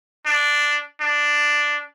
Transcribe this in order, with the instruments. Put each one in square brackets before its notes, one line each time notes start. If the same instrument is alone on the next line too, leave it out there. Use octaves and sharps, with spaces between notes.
[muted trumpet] D4
D4